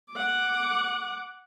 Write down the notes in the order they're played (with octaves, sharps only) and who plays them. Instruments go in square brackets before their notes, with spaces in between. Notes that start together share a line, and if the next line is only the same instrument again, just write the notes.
[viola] F#5 D6